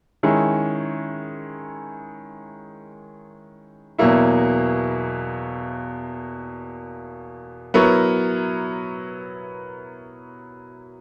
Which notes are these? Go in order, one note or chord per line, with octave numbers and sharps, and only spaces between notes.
D#3 G#3 C#4 E4 G#4
E2 B2 F#3 A#3 E4
F#3 B3 E4 A#4 C#5